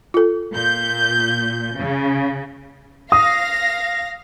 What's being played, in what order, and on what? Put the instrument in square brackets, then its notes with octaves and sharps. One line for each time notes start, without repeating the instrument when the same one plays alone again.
[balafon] F4 A4
[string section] A#2 G6
C#3
[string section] F5 A#6 [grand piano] D#6